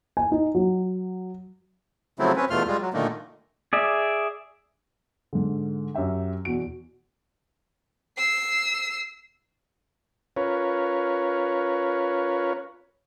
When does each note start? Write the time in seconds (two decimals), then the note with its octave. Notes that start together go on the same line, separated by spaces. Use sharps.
0.17 G#5
0.32 D#4
0.55 F#3
2.19 C#3 F3 F#3 A3 C4 E4
2.36 C4 C#4 B4
2.50 E2 B2 A3 F4 C6 F6
2.68 G3 G#3 F4
2.81 F#3
2.94 A#2 D3 D#3 A3 A#3
3.73 G#4 D5 E5
5.33 G#2 D3
5.94 F#2 G4 E5 G5
6.45 E2 B2 F#4 D7
8.17 E6 C7
10.36 C#4 F4 A#4 B4 C#5